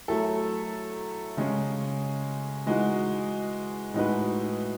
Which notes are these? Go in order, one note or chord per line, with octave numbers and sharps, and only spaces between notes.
F#3 A3 E4 A4
C#3 G#3 C#4
E3 G#3 D#4 F#4
A2 G#3 D#4 F#4 B4